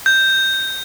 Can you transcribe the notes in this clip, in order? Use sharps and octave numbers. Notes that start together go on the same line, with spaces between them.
G6